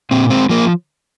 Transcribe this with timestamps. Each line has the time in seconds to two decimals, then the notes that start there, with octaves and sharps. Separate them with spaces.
0.11 A#2 C4
0.30 G#3 C4
0.49 F3 A#3